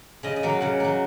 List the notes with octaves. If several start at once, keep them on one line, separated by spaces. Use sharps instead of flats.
C#3 D#5
D#5
F#3 A#3
F5
C#3 F#5
F#3 A#3